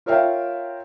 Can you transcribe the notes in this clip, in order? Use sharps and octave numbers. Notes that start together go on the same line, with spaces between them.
F4 A#4 C#5 E5 F5 G5